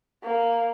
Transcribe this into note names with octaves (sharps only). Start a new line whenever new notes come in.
A#3